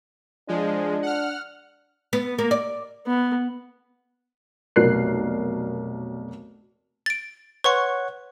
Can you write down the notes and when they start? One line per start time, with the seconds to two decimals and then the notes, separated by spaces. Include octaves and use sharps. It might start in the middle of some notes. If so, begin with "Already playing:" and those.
0.48 F3 G#3 D4
1.03 F#5 F6
2.13 B3
2.38 A#3
2.51 D5
3.07 B3
4.76 F1 B1 A#4 D5 F#6 C7
7.06 A6 D7
7.64 B4 C#5 F#5 C6 C#6